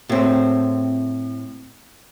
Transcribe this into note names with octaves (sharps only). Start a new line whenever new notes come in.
A2 C4